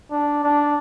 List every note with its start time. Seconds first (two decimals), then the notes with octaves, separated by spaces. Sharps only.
0.11 D4
0.43 D4